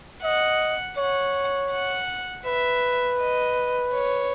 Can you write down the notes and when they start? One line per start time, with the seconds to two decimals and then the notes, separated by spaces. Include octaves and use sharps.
0.23 D#5 F#5
0.97 C#5 F#5
1.71 F#5
2.45 B4 E5
3.19 D#5
3.93 C#5